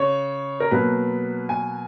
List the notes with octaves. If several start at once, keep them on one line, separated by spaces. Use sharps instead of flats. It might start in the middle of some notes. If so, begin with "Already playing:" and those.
Already playing: C#3 C#5
A#4
B2 F#3 A#3 B4
G#5